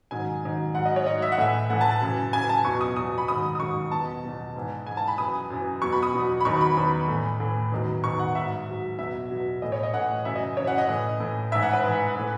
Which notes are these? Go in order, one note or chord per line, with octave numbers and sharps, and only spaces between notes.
G#2 D#3 F#3 G#5
G#2 D#3 F#3
G#2 F#3 F#5
D#5
C#5
G#2 F#3 D#5
E5
F#5
A2 E3 E5
A2 E3 F#5
A5
A5
F#2 C#3 E3
F#2 C#3 E3 G#5
A5
E2 B2 F#3 C#6
D#6
E2 B2 F#3 D#6
B5
G#2 D#3 F#3 D#6
D#6
G#2 D#3 F#3 C#6
E2 B2 F#3 A5
E2 B2 F#3
G#2 E3
G#2 E3 G#5
A5
B5
F#2 E3 D#6
F#2 E3
E2 B2 F#3 C#6
B5
D#6
E2 B2 F#3
B5
E2 D#3 F#3 C#6
B5
E2 D#3 F#3 B5
A2 E3
A2 E3
E2 D#3 F#3
E2 D#3 F#3 C#6
F#5
G#2 F#3 E5
G#2 F#3
E2 B2 F#3 E5
E2 B2 F#3
A2 E3 D#5
C#5
D#5
A2 E3 F#5
F#2 C#3 E3 E5
D#5
F#2 C#3 E3 C#5
F#5
D#5
A2 E3
A2 E3
G#2 E3 E5
F#5
B4
G#2 E3
A2 E3